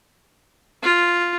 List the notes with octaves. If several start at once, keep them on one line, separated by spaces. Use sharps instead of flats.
F4